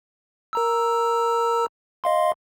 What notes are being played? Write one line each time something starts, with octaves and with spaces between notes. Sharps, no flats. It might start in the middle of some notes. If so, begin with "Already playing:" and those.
A#4 A#5 E6
D#5 F5 C6